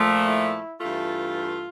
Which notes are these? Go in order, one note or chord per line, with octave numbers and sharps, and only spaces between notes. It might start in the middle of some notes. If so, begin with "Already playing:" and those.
Already playing: A#2 F3 A3
E4
G2 E3 A3 F4